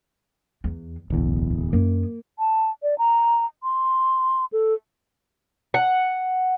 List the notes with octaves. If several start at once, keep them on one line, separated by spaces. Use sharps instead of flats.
E2
D1 B1 E2 C#3
F#2 A#3 D#4
A5
D5
A#5
C6
A4
F#5